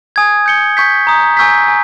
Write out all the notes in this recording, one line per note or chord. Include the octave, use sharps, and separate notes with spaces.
G#5 D#6 G#6
G6 C#7 G7
C#6 G6 B6
A#5 D#6 G6
G#5 C#6 E6 G6 B6
G#5